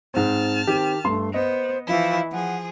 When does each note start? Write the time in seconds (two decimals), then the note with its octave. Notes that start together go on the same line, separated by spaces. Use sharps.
0.14 G#2 C4 A5 F6
0.67 D#3 C4 G4
1.04 G2 A3 C6
1.34 B3 C5 D#5
1.87 E3 F3 E4
2.32 F3 G#4 F#5